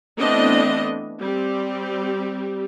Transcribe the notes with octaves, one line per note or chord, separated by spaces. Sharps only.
E3 A3 B3 C4 D4 D#5
G3 C4 G4